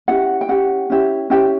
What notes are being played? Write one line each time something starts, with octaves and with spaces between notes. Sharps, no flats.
C#4 E4 G4 F#5
G5
C#4 E4 G4 F#5
C#4 E4 G4
C#4 E4 G4 G5